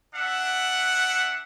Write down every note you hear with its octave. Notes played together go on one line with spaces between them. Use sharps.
D4 E5 F#5